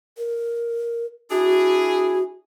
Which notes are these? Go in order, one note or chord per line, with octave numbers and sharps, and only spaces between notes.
A#4
D4 E4 F#4 G#4